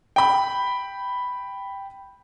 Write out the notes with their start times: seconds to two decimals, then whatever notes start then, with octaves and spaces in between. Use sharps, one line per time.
0.16 G5 B5